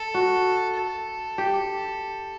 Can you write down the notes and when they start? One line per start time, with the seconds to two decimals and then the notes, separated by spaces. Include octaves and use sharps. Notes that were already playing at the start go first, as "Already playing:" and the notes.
Already playing: A4
0.14 F#4
0.76 A4
1.38 G4